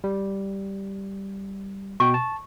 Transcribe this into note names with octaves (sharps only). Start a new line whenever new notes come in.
G3
B2 G5 C#6
A5